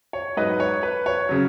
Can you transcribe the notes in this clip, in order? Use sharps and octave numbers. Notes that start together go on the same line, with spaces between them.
C#5
G#2 F#3 B4 D#5
C#5
B4
C#5
C#3 F#3